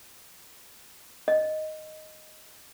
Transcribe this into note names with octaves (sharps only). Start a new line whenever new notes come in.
D#5